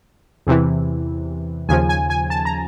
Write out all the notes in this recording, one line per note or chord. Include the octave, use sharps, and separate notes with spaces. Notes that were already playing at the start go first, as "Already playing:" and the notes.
E2 C3 E3
D#2 C#3 F3 G#5
G#5
G#5
A5
A#5